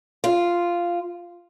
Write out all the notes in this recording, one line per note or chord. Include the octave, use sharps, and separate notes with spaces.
F4